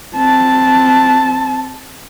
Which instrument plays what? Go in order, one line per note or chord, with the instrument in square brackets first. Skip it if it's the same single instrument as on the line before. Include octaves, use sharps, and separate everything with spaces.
[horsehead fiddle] C4 A5